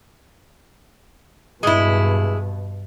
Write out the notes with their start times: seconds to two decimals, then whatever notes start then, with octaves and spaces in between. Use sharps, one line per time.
1.63 G2 B2 G#3 E4